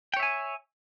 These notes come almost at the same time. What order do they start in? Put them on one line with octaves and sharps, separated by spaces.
G5 C#5 E5 G#5